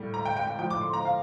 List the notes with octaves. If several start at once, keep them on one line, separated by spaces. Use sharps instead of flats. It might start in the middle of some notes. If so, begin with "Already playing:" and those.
Already playing: A2 G3
A#5
G5
G5
G5
A2 F3 G5
D6
C6
A#5
F5